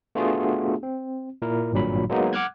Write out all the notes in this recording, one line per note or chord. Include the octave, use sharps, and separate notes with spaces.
A3 B3 D4 F4 F#4 G#4
C4
A#2 E4 A#4
G#1 G2 A#2 F#3 B5
F#3 G#3 A#3 B3 D#4
F#5 D6 F6 F#6 G#6